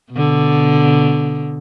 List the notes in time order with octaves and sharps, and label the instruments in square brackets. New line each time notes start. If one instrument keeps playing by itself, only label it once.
[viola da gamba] B2 D3